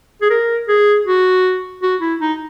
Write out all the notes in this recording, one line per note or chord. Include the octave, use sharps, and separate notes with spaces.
G#4
A#4
G#4
F#4
F#4
E4
D#4